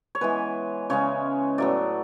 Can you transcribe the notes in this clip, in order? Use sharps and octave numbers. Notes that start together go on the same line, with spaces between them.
C#5
E3 G#3 B3 B4
C#3 G#3 C#4 C#5
A2 F#3 B3 D5